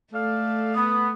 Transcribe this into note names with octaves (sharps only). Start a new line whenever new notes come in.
A3 A4 D5 F5
B3 D#6